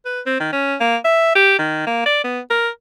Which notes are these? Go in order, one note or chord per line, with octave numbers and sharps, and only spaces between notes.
B4
C4
D#3
C#4
A#3
E5
G4
D#3
A#3
D5
B3
A#4